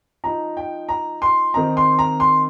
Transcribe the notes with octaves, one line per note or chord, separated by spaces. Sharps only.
F3 D#4 A#5
G5
A#5
C6
D#3 C4 D#4 A#5
C6
A#5
C6